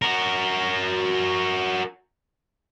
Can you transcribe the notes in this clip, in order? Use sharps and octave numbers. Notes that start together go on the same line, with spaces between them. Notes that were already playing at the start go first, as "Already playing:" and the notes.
F#4 A#4